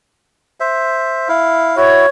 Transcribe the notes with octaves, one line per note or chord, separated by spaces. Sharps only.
C5 E5
E4 F5
E4 F#4 C#5